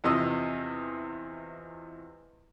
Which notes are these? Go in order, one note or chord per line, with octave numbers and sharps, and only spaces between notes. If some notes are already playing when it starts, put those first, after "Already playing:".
E2 C3 F3 D#5 E6